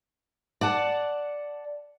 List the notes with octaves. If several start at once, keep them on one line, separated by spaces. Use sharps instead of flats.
D5 F#5 A5